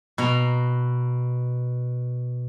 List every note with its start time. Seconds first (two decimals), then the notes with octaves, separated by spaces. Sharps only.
0.18 B2 A#5